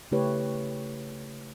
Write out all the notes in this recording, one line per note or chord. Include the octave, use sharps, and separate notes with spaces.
C#3 A3 E4 G4 B4 C#5